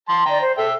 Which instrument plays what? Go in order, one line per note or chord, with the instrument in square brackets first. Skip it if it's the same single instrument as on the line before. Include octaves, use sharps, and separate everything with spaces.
[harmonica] A5 C6
[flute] D5 [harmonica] G5 A#5
[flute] C5
[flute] A4 [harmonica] E5 G5